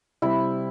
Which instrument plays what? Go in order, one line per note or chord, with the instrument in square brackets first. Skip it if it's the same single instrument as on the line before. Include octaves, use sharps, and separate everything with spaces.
[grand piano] C3 G3 C4 [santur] E4